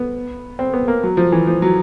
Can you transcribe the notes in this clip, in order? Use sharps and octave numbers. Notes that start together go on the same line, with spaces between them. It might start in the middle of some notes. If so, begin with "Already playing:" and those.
Already playing: B3
C4
B3
A#3
F#3
F3
E3
F3
F#3